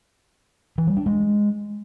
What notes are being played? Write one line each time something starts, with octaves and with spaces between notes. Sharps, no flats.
E3
G3
D4
G#3